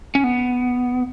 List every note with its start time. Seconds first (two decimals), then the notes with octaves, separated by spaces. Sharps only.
0.15 C#4
0.24 B3